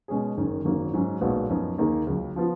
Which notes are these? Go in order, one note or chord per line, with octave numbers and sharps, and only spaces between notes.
B2 G#3 C#4 G#4
F#1 F#2 D#3
G#1 F#2 D#3 F#3 A#3
G#2 F#3 C#4
B1 A#2 G#3 B3 F#4
F#2 F3 B3 D#4
D#2 D#3 A#3 D#4 G#4
C#2 C#3 F#3
F3 B3 F4